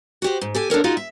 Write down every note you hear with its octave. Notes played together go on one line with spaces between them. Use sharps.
F#4 G4 C5
G#2
G4 A4 G#5
D4 A4 A#4 C#5
D#4 F4 F#4 G#4 D#5 F5
E5